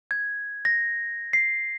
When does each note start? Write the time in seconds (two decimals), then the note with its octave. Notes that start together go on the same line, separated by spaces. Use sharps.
0.11 G#6
0.65 A#6
1.33 C7